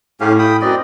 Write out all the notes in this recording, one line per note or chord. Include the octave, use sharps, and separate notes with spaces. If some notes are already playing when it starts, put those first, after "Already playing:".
A2 C#4 G4 F5
G5 B5 D#6
F#2 C4 D5 D#5